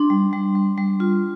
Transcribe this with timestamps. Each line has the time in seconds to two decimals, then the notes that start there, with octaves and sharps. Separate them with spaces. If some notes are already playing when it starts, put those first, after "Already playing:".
Already playing: D4 C6
0.10 G3
0.33 G3
0.55 G3
0.78 G3
1.00 F4